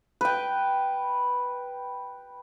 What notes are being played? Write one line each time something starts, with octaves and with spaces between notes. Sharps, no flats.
B4 G5